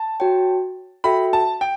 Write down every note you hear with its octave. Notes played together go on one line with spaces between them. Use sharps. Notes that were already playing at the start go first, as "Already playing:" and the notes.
Already playing: A5
F#4 C#5 G5
F#4 A4 E5 G5 B5
A5
G5